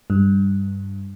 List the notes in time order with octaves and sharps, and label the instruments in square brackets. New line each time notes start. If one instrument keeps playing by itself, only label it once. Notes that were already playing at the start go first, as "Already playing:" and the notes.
[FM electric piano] G2